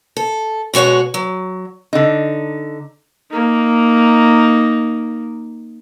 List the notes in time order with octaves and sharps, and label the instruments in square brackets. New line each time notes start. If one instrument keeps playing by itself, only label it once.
[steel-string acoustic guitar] A4
B2 G#3 F#4 C#5 F#5
F#3
[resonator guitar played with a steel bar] D3 D#4
[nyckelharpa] A#3 D#4